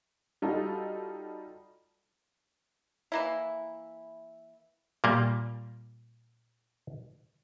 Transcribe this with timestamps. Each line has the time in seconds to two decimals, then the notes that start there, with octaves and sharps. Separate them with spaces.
0.42 G3 D#4 F4 F#4 A4
3.12 E3 A#3 E4
5.04 A#2 G3 A#3